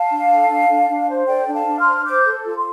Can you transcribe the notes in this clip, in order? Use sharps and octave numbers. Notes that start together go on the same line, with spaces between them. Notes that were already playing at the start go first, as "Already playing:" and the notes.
Already playing: F5 A5
D4
A4
D4
D4
D4
C5
A4 D5 G5
D4
F5 A5
D4
C6 F6
C5
C5 D6 G6
A4
F4
C6